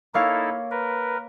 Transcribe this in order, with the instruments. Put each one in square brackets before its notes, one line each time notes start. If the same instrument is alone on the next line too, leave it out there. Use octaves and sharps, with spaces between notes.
[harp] A#3 C#5 F5 [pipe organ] D#4 E4 A4
[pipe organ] A#4 B4